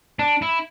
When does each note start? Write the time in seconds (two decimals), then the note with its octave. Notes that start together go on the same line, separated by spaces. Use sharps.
0.19 D4
0.42 E4